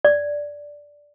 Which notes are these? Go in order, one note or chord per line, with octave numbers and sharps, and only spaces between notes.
D5